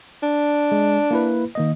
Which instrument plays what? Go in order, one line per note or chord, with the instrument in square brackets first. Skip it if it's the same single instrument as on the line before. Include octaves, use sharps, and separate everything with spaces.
[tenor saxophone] D4
[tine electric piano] G#3
A#3 E4 B4
D#3 A#3 D#5